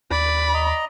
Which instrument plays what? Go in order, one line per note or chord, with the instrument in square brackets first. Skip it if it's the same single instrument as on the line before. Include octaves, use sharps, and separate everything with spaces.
[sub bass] D#2 [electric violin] D5 B5
[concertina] D#5 A#5